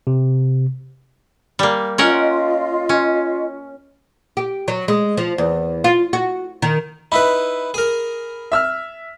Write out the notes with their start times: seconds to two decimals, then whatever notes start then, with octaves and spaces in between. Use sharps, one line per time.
0.07 C3
1.59 G3 A#3
1.98 C#4 F4 A#4 D#5 F#5
2.89 C#4
4.37 G4
4.68 F#3
4.88 G#3
5.17 F3
5.38 E2
5.84 F4
6.13 F#4
6.62 D#3
7.12 D#4 E4 B4 B5
7.74 G#4 A#4
8.52 E5 E6 F6